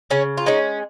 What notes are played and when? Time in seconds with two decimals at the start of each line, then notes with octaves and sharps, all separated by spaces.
0.10 C#3 C#4
0.37 F4
0.46 G#3 C#4 D#4